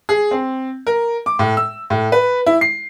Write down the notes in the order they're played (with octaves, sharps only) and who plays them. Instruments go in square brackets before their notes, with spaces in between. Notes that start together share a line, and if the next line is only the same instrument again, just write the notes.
[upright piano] G#4
C4
A#4
D6
A2
E6
A2
B4
E4
C7